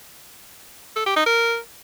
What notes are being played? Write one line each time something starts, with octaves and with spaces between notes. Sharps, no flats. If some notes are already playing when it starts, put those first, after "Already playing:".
A4
G4
D#4
A#4